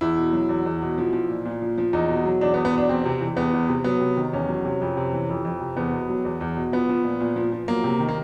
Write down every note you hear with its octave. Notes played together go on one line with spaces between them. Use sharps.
E2 E4
B2
F#3
E2
E2
B2
F3
F3
A#2
A#2
F3
F3
E2 D#4
B2
F#3
E2 D4
B3
E2
B3
B2 D4
E2 C4
C3
E3
E2 B3
E2
C3
F#3 B3
C3
D#3
E2 C#4
F#3
C3
F2
C3
E3
F2
F2
C3
E2 B3
B2
F#3
E2
E2
B2
F3 B3
F3
A#2
A#2
F3
F3
F#3 A#3
C3
D#3
A#3